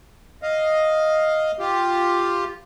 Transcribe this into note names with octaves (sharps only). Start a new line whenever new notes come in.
D#5 F5
F4 G4